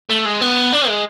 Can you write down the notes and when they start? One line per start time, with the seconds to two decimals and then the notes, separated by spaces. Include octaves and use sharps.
0.10 A3
0.26 G#3
0.42 B3
0.73 D4
0.88 G#3